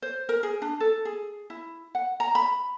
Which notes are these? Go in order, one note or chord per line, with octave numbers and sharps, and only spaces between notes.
C5
A#4
G#4
D4
A4
G#4
E4
F#5
A#5
B5